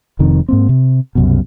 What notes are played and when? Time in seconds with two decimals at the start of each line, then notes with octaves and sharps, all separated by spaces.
0.19 F1 F2 C3 D#3
0.49 G#2 A#3 C4
0.69 C3
1.15 C2 F#2 B2